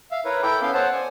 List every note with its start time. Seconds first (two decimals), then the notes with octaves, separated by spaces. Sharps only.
0.11 E5 F5
0.25 E4 A#4 B4 C#5
0.43 E4 A4 G5 D6
0.62 B3 C#4 A4 F5 G6
0.74 C5 C#5 F#5 A5
0.93 D5 G#5